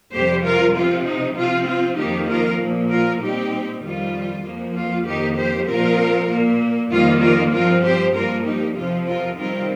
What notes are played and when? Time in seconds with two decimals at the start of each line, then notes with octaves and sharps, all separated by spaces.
0.13 F2 C3 G3 G4 C5
0.44 F4 A#4
0.74 C3 F3 C4 F4
1.05 D#4
1.36 C3 F3 C4 F4
1.67 F4
1.98 F2 D#3 A#3 D#4 G4
2.28 F4 A#4
2.60 A#2 F3 A#3
2.90 F4 A#4
3.21 A#2 G3 C4 D#4 G4
3.83 F2 D#3 G3 F4
4.44 F2 F3 A#3
4.76 F4
5.06 F2 D#3 A#3 D#4 G4
5.37 G4 C5
5.67 A#2 F3 C4 F4 A#4
6.30 A#2 A#3
6.91 F2 D#3 G3 A#3 F4
7.21 F4 A#4
7.52 G2 F3 C4 F4 A#4
7.83 G4 C5
8.14 G2 F3 A#3 F4 A#4
8.45 D#4 G4
8.75 F2 C3 F3 C4 F4
9.07 F4 A#4
9.38 C3 D#3 G3 C4 F4 A#4